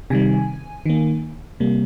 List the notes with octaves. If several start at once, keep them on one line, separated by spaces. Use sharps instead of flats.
C3 D#3 G3 G#5
D#3 A#3
C3 G3 A#3